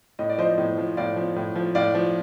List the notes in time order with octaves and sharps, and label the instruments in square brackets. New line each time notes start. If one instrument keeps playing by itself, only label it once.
[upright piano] A2 D#5
D5
F3 C5 D#5
A2
F3
A2 D5 F5
F3
A2
F3
A2 D5 F5
F3